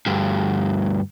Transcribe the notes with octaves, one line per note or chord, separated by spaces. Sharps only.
D2 G2